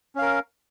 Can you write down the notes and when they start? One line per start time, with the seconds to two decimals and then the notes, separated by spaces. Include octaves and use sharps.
0.15 C#4
0.19 F5
0.22 A#4